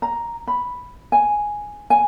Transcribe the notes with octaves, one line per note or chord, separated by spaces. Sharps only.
A#5
B5
G#5
G#5